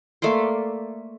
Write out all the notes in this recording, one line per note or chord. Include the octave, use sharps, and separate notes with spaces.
A3 A#3 D5 C6